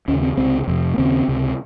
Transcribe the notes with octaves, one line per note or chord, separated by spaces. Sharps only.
D#2 C#3 C#4
C4
C#2 C3 C4
F2 C3
A#3
D#2 C#3 C4
C#2 C3